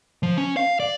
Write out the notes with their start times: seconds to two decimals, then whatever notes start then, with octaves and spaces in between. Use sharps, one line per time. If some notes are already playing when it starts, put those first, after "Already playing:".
0.23 F3
0.37 C#4
0.57 F5
0.80 D5